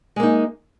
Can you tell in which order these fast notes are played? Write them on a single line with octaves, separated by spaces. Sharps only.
G#3 A#3 D#4